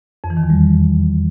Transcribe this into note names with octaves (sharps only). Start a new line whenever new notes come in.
F2
E3
D#3
E2
G3